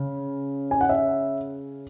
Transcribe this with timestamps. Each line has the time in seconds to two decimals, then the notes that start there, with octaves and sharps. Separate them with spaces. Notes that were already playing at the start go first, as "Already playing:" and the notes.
Already playing: C#3
0.71 G#5
0.81 F#5
0.89 E5